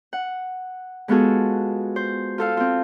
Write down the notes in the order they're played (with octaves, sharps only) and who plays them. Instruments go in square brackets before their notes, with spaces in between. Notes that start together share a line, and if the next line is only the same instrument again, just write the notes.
[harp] F#5
G#3 B3 F4 F#4 G#4 A4
C5
F4 A4 F5
C4 F4